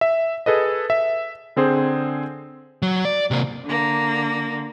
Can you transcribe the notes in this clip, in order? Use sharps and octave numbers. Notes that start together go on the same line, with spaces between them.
E5
G#4 A4 B4 D#5
E5
D3 C4 G#4 C5
F#3
D5
C3 A#3
D3 A#3